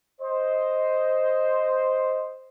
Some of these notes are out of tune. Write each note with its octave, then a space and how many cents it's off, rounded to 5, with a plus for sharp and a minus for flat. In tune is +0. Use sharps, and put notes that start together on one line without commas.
C5 +0 D#5 +0